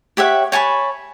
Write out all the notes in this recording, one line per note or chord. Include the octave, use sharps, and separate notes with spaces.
G4 C#5 E5 F#5
C#5 G#5 A5 B5